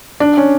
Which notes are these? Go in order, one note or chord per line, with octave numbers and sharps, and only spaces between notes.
D4
C#4